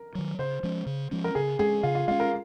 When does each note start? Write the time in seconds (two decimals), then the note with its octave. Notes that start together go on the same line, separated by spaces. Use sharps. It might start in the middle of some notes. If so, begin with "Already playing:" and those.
Already playing: A#4
0.15 D#3 F#3
0.39 C#3 C5
0.63 F3 G#3 C#4
0.86 C#3
1.11 F3 G#3 C#4
1.24 A#4
1.35 C#3 G#4
1.59 G#3 C#4 G#4
1.83 C#3 F4
1.95 F4
2.08 G#3 C#4 F4
2.20 A#4